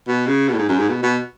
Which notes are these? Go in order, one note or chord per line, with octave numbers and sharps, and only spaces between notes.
B2
C#3
B2
A2
G#2
F#2
G#2
B2
B2